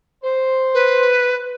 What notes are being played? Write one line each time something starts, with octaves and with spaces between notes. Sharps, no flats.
C5
B4